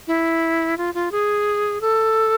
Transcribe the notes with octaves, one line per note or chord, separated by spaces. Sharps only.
E4
F4
F4
G#4
A4